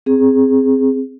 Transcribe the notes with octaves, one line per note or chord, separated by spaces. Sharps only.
C4 G#4